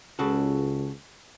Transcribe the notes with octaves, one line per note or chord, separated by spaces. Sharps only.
C#2 C#3 F#4 A4